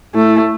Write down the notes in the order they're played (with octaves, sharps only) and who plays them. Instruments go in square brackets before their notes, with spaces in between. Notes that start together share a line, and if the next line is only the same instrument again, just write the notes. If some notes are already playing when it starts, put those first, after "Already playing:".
[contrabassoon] A2 [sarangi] A3